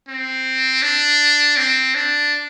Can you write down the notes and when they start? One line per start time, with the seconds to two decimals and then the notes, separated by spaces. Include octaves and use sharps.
0.08 C4
0.82 D4
1.57 C4
1.95 D4